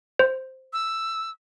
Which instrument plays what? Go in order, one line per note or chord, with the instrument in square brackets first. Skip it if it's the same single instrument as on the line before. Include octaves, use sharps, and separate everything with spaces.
[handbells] C5
[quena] E6